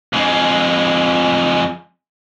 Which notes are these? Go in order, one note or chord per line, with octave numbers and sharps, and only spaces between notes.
F2 G#3